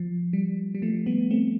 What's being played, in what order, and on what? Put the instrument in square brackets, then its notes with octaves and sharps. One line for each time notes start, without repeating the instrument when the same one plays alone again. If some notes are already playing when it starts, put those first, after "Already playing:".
Already playing: [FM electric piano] F3
G3
G3
F3 A3
G3 B3
A3 C4